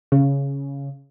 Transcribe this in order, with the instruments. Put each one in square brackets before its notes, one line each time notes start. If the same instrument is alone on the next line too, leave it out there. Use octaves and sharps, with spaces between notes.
[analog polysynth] C#3